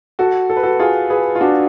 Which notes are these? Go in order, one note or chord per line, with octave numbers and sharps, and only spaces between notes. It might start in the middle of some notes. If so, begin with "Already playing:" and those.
F#4 A4
A4
B4
F#4 A4
F4 G#4
G#4 B4
F4
D4 F#4